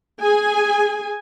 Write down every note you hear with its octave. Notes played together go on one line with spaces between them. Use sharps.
G#4 G#5